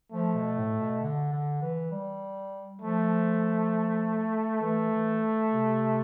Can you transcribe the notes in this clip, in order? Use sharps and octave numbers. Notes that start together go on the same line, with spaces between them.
F3 A3
B2
A2
B2
D3
D3
E3
G3
F3 A3
E3 A3
E3
C3